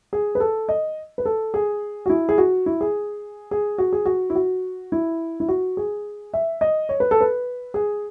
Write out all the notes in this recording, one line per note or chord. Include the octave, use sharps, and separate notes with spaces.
G#4
B4
A4
D#5
B4
A4
G#4
F#4
E4
G#4
F#4
E4
G#4
G#4
F#4
G#4
F#4
E4
F#4
E4
E4
F#4
G#4
E5
D#5
C#5
B4
A4
B4
G#4